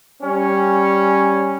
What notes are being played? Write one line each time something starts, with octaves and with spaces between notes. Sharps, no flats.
G3 C#4